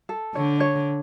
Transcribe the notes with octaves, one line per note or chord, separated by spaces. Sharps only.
A4
D3 C#5
C#5